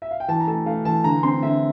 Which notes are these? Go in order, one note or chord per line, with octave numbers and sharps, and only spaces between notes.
E5
F5
G5
E3 A5
A#5
A3 A5
A3 F5
E3 A5
D3 A#5
C4 C6
D3 E5